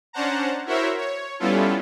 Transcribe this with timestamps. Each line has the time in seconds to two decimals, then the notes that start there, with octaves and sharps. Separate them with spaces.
0.13 C#4 D4 C5 F#5 A5 A#5
0.66 E4 F#4 A#4 C5 C#5 E5
0.98 C#5
1.39 G3 B3 C#4 E4 F4 A4